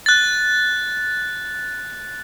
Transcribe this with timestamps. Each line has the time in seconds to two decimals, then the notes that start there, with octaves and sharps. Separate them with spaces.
0.06 F#6 A6